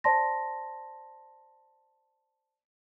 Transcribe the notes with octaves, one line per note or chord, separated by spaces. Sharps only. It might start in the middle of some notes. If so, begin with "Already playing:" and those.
C5 D5 A5 C6 A#6